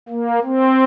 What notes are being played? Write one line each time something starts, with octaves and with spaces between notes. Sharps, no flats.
A#3
C4